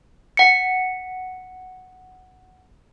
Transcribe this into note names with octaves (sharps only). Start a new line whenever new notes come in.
F#5 C#7